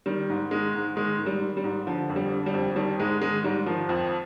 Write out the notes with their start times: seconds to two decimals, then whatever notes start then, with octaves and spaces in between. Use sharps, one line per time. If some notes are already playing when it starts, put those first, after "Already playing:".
0.06 D#3 G3
0.30 G#2
0.51 D#3 G#3
0.74 G#2
0.96 D#3 G#3
1.18 G#2
1.26 G3
1.41 D#3
1.57 G3
1.64 G#2
1.87 D3 F3
2.09 F2
2.16 G3
2.32 D3
2.46 G3
2.54 F2
2.76 D#3 G3
2.99 G#2 G#3
3.21 D#3 G#3
3.44 G#2 G3
3.66 D#3 F3
3.89 F2